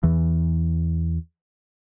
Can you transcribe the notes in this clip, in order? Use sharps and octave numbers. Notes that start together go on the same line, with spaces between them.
E2 E3